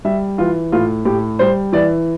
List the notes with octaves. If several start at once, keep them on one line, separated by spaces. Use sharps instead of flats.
G3 E5
E3 F4
A2 F4
A2 G4
G3 C5
E3 D5